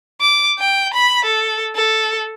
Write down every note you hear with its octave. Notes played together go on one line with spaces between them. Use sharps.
D6
G5
B5
A4
A4